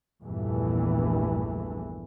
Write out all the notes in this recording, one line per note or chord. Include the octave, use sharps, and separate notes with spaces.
A#1 E2 G2 E3 A3